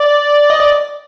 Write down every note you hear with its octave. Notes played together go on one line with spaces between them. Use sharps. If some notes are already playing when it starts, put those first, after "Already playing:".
Already playing: D5
D#5
D5